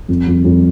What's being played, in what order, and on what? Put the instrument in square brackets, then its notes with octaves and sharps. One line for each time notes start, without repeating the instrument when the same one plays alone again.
[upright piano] F2
F2
F2